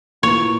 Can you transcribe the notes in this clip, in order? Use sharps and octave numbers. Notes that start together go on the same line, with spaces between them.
A#2 A#3 E4 B4 C#5